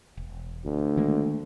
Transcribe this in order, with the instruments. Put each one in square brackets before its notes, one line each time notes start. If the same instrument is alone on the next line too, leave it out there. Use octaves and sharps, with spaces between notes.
[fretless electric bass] E1
[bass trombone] D2
[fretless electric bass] D#3 G#3 A#3